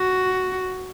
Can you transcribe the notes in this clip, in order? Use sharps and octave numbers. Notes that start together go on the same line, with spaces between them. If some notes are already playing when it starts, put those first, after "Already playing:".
Already playing: F#4